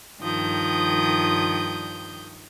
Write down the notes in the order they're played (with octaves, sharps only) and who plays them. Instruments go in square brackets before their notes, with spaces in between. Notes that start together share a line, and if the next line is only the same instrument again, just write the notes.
[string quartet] G2 D#3 F3 D#6 G6